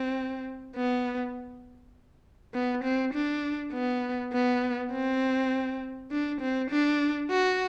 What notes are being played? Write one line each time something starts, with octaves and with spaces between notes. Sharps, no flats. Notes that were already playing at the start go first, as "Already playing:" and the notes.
Already playing: C4
B3
B3
C4
D4
B3
B3
C4
D4
C4
D4
F#4